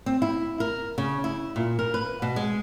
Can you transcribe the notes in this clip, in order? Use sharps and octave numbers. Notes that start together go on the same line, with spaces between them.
C4
E4
A#4
C#3
E4
A#2
A#4
B4
B2
G#3